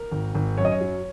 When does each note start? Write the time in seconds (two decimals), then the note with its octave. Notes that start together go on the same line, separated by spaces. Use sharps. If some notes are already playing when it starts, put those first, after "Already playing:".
Already playing: A#4
0.12 G#1
0.35 G#1
0.58 F#2 C#5
0.65 D#5
0.72 C#5
0.81 F#3